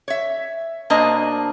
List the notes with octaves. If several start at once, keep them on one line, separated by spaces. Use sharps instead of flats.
C#5 E5
B2 A#3 D4 C5 D#5 A5